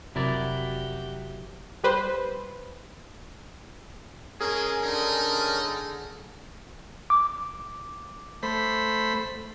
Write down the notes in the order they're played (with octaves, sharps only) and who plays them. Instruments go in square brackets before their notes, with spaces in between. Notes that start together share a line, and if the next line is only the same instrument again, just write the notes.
[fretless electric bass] F1 C3 [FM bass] F#3 [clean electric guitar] E4 A#4 D5 [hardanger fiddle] F#4 G4
[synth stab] G3 B4 C5
[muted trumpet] G#3 [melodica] C#4 A#4 [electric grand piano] G#4 G#5
[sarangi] D3 [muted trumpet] D#4
[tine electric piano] D6
[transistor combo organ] A3 C5 B5